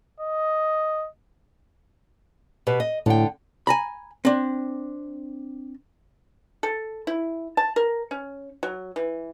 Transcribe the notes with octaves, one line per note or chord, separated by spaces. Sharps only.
D#5
B2 G4 B4
D#5
A2 D3 G5
G#5 A#5 B5
C4 D4
A4
E4
A5
A#4
C#4
F#3
E3